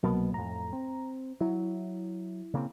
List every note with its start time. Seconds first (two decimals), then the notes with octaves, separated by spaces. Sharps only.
0.03 C2 B2 F#3 A#3 B3
0.34 F2 A2 A#5
0.73 C4
1.41 F#3 E4
2.53 C#3 A#3 C4